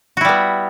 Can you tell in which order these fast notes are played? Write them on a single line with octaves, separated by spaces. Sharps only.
F#4 E4 G3 B3